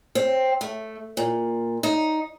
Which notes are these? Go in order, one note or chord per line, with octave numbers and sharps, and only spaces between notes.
C4
A3
A#2
D#4